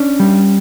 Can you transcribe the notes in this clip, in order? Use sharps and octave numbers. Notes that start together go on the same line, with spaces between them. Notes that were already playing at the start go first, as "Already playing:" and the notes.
Already playing: C#4 D4
G3